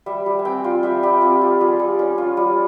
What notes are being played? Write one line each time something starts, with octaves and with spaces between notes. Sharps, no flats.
G3 E5
G3
G#5
C4 G5
F4
G3 E5
G3 G4
C4 F4
F4 G4
G3 G#4
G3
C#4
F4
G3